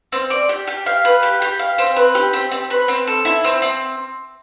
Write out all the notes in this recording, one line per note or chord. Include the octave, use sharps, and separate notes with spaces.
C4
D5
G4
G4
F5
B4
G4
G4
F5
C4
B4
G4
C4
C4
B4
C4
A4
E4
C4
C4